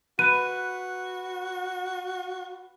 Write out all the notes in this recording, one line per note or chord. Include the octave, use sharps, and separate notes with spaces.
F#4 B4 D#7